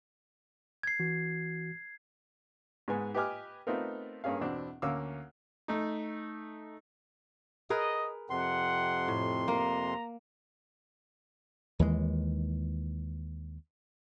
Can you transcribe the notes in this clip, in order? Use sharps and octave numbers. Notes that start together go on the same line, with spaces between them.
G#6 C7
E3 F#4
G#2 G#3 B3 G#5
G4 B4 D#5 G#5 D6 F6
A3 B3 C4 D#4 F4 A#4
G2 A#3 C#4 G#4 F5
E2 B2 C4 D4 E4
D2 A#3 C#4 F5 D6 E6
A3 D#4
G#4 A#4 B4 D#5
F2 C3 F#5 C6
A2
A#3 A#5
D#2 E3 G#3